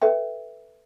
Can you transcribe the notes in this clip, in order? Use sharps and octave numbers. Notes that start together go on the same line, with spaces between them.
A4 B4 E5 G5